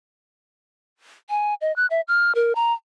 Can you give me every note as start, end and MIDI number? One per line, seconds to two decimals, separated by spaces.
1.29 1.54 80
1.61 1.74 75
1.76 1.86 90
1.90 2.01 76
2.08 2.32 89
2.35 2.55 70
2.55 2.73 82